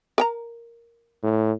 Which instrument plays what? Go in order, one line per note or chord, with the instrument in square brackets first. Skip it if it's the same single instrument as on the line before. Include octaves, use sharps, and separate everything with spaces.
[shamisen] A#4 G5 A#5
[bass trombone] A2